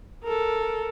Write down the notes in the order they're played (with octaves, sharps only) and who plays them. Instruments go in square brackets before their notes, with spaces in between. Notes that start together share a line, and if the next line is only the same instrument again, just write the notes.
[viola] A4 A#4